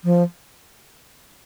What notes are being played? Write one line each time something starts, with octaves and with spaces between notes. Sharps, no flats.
F3